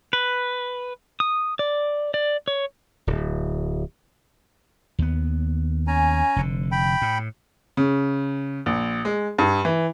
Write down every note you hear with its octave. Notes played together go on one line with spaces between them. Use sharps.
B4
D#6
D5
D5
C#5
D1
D#2 B3
C#4 G#5 A#5
F1 D3
G5 B5
A2
C#3
A#1
G#3
G2
E3